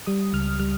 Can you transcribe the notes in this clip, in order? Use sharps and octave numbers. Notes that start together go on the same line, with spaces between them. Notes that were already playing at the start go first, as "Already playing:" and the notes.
G3 D#6
C#2 F6
G3 F6